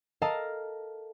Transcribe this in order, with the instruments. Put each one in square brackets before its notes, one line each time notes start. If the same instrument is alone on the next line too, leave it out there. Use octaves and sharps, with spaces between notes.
[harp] A4 A#4 D#5 F5 A5 A#5